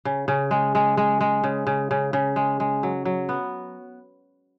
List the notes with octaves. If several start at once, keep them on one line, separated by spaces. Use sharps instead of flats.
C#3
C#3
G#3
G#3
G#3
G#3
C#3
C#3
C#3
C#3
G#3
G#3
F#3
F#3
B3